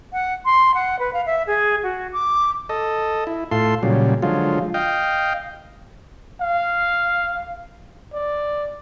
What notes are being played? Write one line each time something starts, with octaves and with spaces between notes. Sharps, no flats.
F#5
C6
F#5
B4
F5
E5
G#4
F#4
D6
A4 D#5
E4
A2 F4 A4 C6
A#2 C#3 F#3 G3
D3 F3 F#3 G#3 F4
D#5 F5 G5
F5
D5